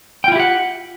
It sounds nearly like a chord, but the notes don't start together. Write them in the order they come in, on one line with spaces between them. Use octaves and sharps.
G5 F4 E4 G4 F#5